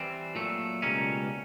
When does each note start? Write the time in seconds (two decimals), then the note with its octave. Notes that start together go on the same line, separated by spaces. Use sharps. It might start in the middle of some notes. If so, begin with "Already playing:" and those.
Already playing: E3 G3 C4
0.35 A#2 F#3 A3
0.82 C#2 B2 G3 A#3 C#4